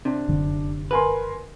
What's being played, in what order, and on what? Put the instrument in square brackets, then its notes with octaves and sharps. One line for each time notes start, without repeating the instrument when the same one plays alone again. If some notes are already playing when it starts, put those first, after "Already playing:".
[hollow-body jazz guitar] C3 [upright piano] D4
[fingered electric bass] F1 F#2 D3
[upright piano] A#4 G#5 C6 [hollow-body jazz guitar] B4